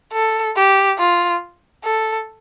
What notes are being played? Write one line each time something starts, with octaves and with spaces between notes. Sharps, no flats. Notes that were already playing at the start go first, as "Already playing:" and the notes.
A4
G4
F4
A4